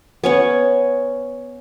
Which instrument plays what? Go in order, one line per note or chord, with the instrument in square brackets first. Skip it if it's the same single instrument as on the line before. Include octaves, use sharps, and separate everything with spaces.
[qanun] B3 C#4 C#5